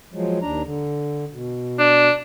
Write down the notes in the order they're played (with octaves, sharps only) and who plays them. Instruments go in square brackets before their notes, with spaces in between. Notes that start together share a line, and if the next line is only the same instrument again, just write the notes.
[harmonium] F3 F#3 G#3
D#2 D4 A#5
D3
B2
[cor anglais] D4